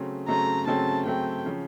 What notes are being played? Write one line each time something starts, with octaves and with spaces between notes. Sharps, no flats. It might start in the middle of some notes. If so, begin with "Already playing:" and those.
Already playing: C#3 F#3 A3 C4
C#3 F#3 A3 C4 A#5
C#3 F#3 A3 C4 A5
C#3 F#3 A3 C4 G5
C#3 F3